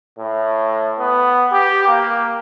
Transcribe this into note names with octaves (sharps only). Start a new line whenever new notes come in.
A2
B3
G4
A#3